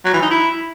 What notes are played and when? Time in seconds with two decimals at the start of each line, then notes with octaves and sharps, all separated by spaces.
0.05 F#3
0.14 E3
0.22 D#4
0.31 E4